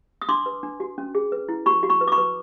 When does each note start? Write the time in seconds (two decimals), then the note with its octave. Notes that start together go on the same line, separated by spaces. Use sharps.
0.22 D#6
0.29 D4 C6 D6
0.46 B4
0.63 D4
0.80 F#4
0.98 C#4
1.15 G#4
1.32 B4
1.49 E4
1.66 F#4 B5 C#6
1.83 F#4
1.89 B5 C#6
2.01 B4
2.08 D6
2.12 B5 C#6
2.18 B4